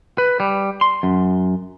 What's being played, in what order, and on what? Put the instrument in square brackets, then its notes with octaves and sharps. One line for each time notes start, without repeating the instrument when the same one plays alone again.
[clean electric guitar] B4
G3
C6
F#2